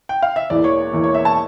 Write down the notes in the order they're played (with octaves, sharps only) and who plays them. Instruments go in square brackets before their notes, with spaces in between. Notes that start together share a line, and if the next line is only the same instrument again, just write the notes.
[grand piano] G5
F5
E5
E1 E2 E3 A#3 D5
C#5
E1 E2 E3 A#3
C#5
E5
A5